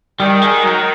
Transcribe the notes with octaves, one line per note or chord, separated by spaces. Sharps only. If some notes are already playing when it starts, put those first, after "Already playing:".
D#3 G3
G#3
F#3